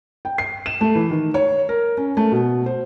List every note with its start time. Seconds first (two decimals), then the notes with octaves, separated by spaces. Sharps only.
0.25 G5
0.38 C7
0.66 E7
0.81 A3
0.95 E3
1.11 D#3
1.34 C#5
1.69 A#4
1.97 C#4
2.17 A3
2.32 B2
2.66 C5